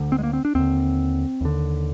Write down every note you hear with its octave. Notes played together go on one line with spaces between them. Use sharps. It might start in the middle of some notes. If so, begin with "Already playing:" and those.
Already playing: D2 D3
C4
G#3
A#3
C4
D4
D#2 D3 C4
D#2 D3